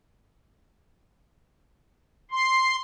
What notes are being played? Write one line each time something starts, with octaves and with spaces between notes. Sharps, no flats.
C6